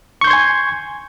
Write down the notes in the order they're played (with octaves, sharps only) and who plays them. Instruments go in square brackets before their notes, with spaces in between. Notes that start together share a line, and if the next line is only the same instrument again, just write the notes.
[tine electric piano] C#6
G6
C6
G#6
G#5